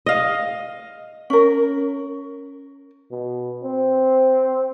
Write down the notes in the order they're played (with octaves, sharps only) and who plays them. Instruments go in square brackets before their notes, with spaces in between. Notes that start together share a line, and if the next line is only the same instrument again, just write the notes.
[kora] D#5 F5
[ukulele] C#4 A#4
[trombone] B2
C4